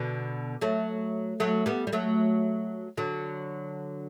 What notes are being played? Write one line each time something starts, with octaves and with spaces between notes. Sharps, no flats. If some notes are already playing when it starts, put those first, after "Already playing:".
Already playing: B2 D3
F#3 A3
F#3 A3
G3 B3
G3
F#3 A3
D3 F#3